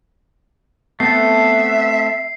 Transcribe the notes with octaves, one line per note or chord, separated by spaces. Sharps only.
A3 B3 C4 A4 E5 C7